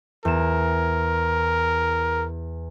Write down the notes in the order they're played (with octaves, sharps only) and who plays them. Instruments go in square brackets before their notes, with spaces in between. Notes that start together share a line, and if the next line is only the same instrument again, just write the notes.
[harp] E2 E7 [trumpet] A#4